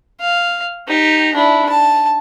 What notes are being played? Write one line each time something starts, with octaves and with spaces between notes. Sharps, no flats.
F5
D#4 G4
D4 E4
A5